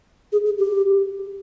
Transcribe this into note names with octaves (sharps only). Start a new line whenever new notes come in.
G#4
G#4
G4